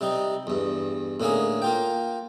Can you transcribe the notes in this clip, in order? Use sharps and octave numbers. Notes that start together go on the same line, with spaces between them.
C3 G3 D#4
E2 G2
A2 D3 A#3 C#4 G#4
A#3 F4 G5